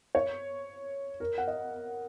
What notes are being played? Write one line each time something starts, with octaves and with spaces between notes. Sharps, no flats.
C#5
A#4
F#5
D#5